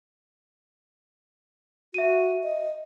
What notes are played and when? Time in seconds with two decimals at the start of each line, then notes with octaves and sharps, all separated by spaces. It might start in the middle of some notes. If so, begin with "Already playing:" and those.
1.94 F#4 E5 D#7
2.43 D#5